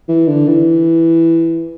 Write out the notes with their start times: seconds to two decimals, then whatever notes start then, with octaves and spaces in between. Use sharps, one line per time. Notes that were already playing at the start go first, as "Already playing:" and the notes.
0.08 E3
0.28 D3
0.48 E3